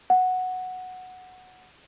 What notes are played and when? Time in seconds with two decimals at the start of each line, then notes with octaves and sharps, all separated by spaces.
0.10 F#5